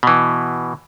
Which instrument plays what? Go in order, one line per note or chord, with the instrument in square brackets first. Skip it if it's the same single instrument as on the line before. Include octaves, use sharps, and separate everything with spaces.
[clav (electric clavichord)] B2 E3